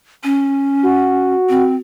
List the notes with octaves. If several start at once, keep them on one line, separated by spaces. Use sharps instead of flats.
C#4
F#4
C4